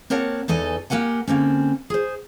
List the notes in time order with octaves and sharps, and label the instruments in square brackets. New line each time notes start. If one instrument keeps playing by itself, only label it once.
[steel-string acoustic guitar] A#3 C4 A#4 C#5 F#5 A5
E2 E3 D#4 A4 G#5
A#3 G4 A#4 F#5 G#5
D3 A#3 C4 C#4
G#4 C5